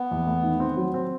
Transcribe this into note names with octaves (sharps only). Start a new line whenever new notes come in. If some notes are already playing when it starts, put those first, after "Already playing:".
Already playing: B3
E2
A3
D#3
C4
F#3
C4